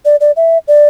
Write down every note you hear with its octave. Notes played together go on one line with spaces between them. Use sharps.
D5
D5
E5
D5